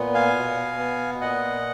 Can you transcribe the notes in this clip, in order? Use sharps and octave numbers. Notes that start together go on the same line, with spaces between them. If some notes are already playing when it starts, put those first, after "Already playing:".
Already playing: A#2 B3
F5 G#5
B2
B3
A#2 D#5 F#5